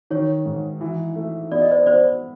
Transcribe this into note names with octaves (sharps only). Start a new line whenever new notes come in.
D#3 C#5
G#2
E3
A3
B3 D5
D#5
C5 D5
B3 C5 D5